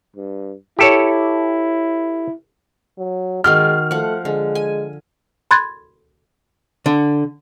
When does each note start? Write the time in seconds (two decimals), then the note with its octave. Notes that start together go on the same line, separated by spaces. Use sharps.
0.16 G2
0.79 E4 G4 A4 C#5
2.98 F#3
3.44 D#3 G#3 F#4 C6 F6
3.91 F3 A3 F#5
4.25 D3 G#3
4.55 G#5
5.51 B5 C6 F#6 G#6 A6
6.86 D3